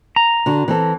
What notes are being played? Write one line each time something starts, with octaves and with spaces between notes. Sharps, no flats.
A#5
D3 F#4
E3 C4 A4